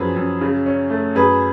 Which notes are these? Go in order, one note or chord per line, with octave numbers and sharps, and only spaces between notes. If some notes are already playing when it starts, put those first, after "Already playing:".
Already playing: F#2 F3 G#4 B4
F#2
C#3
C#4
A3
F#2 G#4 B4